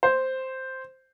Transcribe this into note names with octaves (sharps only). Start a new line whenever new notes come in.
C5